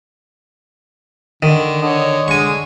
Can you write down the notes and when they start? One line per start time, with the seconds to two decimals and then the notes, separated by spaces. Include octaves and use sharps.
1.43 D3 D#3
1.82 D3 C#5 D#5
2.28 D3 G#3 G#5 C#6